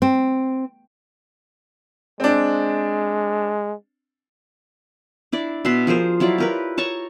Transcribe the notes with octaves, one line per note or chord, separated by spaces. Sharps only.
C4
G#3 C4 D4
D4 E4 D5
B2 B4 E5 C6
F3 G#4 A#4 C5
F#3 E4 F4 D5
G4 A#4 B4
C#5 A5 A#5 C#6